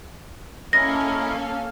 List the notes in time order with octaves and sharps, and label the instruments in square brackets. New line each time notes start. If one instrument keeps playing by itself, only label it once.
[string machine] A#3 A4 F5 [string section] C#4 [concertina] E4 A#4 D#5 [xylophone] A#6